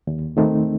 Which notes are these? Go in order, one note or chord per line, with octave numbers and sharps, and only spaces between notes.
D#2
D#3 A3 C4 D#4